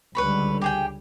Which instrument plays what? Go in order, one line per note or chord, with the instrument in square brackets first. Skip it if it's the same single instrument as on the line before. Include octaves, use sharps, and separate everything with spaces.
[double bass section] C#2 D3 G3 [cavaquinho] B4 C#5 B5
[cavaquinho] G4 G#4 G5